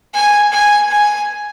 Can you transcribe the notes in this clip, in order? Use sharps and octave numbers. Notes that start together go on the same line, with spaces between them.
G#5
G#5
G#5